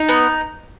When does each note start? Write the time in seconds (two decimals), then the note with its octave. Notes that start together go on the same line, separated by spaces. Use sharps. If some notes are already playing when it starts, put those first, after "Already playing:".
Already playing: D#4
0.09 B3